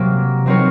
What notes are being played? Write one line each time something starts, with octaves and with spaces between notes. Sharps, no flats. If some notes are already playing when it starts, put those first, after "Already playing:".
Already playing: C3 F#3 A#3
F#3 C4 D#4 A#4 C#5